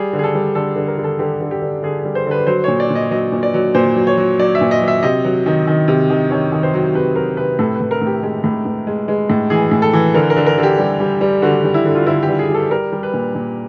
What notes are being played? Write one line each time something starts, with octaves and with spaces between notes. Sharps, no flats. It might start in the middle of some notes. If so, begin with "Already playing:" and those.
Already playing: G3 G#4
D3
G#4
A4
G3
D3 A4
D3
A#4
D3
A4
D3 G4
D3
G4
D3
D3 G#4
G#4
G3
C5
D3 B4
F#3 C5
A#2 C#5
D5
A#2
D#5
F#3 D#5
A#2
D5
F#3
A#2 C5
F#3
C#5
F#3
F#3 D5
E5
A#2
D#5
F#3
E5
C3 D#5
F#3
D#3
D#3
C3
D#3
D#3 C#5
D#3
C5
F#3
C3 B4
F#3 A#4
C3 B4
A2 A4
B4
A2
A#4
A2
G4
G#3 G4
A2
A2
G#3
G#3
A2
E3 G#4
A2
A4
E3
D3 A#4
A#4
D3
A#4
D3
G4
G3
G3
G3
D3 F#4
G3
E4
D3
F4
D3 E4
G4
G3
G#4
G3 A4
G3 A#4
G3
B4
A#2
A#2